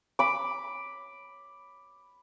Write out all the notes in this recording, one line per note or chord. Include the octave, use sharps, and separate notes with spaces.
B5 D6